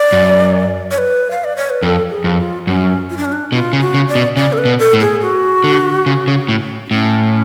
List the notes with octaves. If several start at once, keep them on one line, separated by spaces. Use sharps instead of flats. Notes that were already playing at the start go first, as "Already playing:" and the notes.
Already playing: D5
F#2
C#5
B4
F5
D5
C#5
B4
F2 A4
G#4
F2
F4
F#2 C#4
F4
D4
C#4
D4
B2 F4
C#3
F#4
C#3
D5
B2
C#3 D5
A4
B4
B2
A4
A2
G#4
F#4
D3
C#3
C#3
A2
D4
A2 C#4